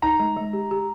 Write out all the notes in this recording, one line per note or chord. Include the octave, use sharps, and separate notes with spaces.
D#4 A#5
G#3
G#3
G4
G4